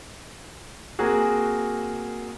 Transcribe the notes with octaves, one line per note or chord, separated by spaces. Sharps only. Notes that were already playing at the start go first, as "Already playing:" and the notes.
A#3 C4 F#4 G#4